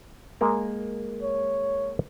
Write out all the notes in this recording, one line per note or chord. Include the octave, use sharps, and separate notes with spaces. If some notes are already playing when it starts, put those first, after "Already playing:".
G#3 A#3 A#4
C#5